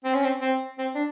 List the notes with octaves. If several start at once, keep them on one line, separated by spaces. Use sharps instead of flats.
C4
C#4
C4
C4
C4
D4